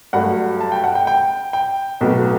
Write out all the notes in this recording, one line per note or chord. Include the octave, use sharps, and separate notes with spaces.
G2 F#3 A3 F#5
A5
G5
F#5
G5
G5
G5
B1 A2 F#3 B3